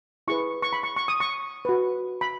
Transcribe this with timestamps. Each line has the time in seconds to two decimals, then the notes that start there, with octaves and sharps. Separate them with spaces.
0.28 E4 G#4 B4 C#6
0.62 C#6
0.73 B5
0.83 C#6
0.96 C#6
1.08 D#6
1.20 C#6
1.65 F#4 B4
2.21 B5